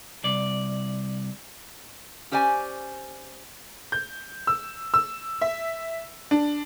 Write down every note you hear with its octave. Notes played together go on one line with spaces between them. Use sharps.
C2 D5
C#4 G4 C5 D5 G#5
G6
E6
E6
E5
D4